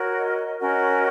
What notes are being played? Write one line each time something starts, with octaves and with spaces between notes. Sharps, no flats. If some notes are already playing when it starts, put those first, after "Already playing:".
Already playing: F#4 A#4 C#5
D#5
C#4 F#4 A#4 C#5 D#5